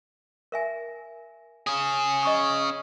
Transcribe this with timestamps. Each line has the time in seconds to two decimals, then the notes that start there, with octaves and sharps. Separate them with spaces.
0.52 A#4 E5 G#5
1.67 C#4 G#4
2.23 D#5 C#6 D#6